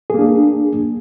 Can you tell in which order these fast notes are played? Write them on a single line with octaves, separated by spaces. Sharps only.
G#4 A#3 D4